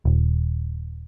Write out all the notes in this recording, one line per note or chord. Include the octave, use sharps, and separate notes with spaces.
D#1